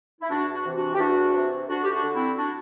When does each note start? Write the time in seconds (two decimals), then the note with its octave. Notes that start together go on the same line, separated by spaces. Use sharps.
0.21 E4
0.29 E2 D4 F#4
0.52 D4 F#4
0.64 C3 E3
0.75 D4 F#4
0.94 G4
0.99 E2 D4 F#4
1.33 C3 E3
1.68 D2 D4 F#4
1.83 G4
1.91 D4 F#4
2.02 D3
2.14 C4 E4
2.37 D4 F#4